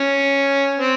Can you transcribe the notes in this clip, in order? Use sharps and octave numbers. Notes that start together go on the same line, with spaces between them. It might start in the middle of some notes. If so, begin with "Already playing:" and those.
Already playing: C#4
C4